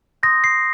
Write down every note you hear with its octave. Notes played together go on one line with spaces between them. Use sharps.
C6 D#6 G6 A#6
C7